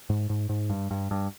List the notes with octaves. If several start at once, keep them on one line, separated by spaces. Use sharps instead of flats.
G#2
G#2
G#2
G2
G2
G2